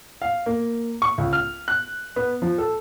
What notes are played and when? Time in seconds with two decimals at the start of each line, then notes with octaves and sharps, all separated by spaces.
0.22 F5
0.46 A#3
1.02 C#6
1.18 C#2
1.33 F6
1.68 F#6
2.16 B3
2.42 F3
2.58 A4